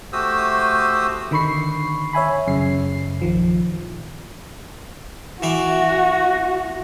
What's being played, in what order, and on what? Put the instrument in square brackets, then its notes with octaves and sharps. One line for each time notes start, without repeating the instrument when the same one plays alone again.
[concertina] A3 F#4 G4 C5 D#6 E6
[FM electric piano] D3 D#3 B5 C#6 C7
C#5 E5 G#5 B5
F#2 C#3 C7
A#1 D#3 F3
[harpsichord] E3 E5 D6 [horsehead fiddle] F#4